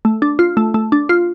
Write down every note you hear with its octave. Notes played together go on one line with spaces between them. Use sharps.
A3
D4
F4
A3
A3
D4
F4